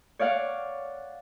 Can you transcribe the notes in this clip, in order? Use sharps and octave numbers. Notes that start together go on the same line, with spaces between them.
C#5 D5 F5 F#5